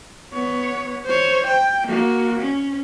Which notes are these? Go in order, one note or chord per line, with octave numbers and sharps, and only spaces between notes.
B3 C#5
C5 C#5
G5
A#3 F#4
C#4